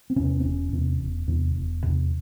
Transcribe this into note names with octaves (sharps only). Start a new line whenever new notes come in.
C4
E2 C3 C#4
C4
E1 C#4
E2 C3
E1
E2 C3
E1
E2 C3